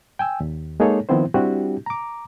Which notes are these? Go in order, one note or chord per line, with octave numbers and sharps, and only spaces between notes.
G5 G#5 E6
D#2
G#3 A#3 D#4 G#4 A4 C#5
D#3 F3 B3 C4 E4 C5
G3 C4 D4 E4 F#4 G4
A#5 D6